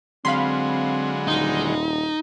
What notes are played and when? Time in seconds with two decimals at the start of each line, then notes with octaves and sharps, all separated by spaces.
0.25 D3 F#3 G#3 C4 F5 B5 C6
1.27 D#1 D#4